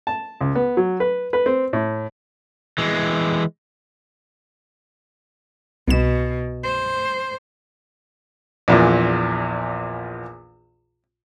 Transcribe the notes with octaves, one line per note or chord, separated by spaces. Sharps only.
A5
C#2
B3
F#3
B4
B4
C4
A2
E3 G#3
C2 B2 E7
C5
A#1 E2 A#2